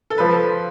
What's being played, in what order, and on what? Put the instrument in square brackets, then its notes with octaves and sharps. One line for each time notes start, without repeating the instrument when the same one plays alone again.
[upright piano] A4
[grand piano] F3 [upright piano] B4